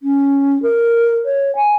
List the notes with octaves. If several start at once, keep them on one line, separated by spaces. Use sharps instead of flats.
C#4
A#4
C#5
G#5